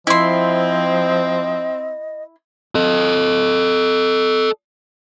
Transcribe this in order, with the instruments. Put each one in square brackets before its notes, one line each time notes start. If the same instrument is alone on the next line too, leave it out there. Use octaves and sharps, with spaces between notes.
[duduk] F3 [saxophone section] C4 [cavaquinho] E4 C6 [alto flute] D#5
[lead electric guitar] A4 D#5